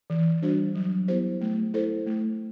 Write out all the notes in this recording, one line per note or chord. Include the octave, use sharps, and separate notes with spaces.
E3
G3 D4 F#4 C5
F#3
B3 E4 G4 C5
A3
E4 A4 C5
A3